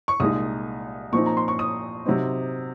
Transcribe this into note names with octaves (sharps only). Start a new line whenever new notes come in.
C#6
C2 A#2 G#3 D#4 D#6
A#2 F3 C4 D#4 C#6
A#5
C6
C#6
D#6
C3 F#3 C4 D#4